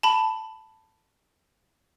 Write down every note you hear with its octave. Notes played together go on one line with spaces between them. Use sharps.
A5 B5